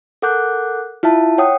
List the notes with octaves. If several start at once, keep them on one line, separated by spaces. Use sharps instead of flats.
A4 A#4 F#5 D6 F#6 G6
E4 F4 E5 A5
C#5 F#5 G5 D#6